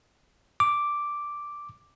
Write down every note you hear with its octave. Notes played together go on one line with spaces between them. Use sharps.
D6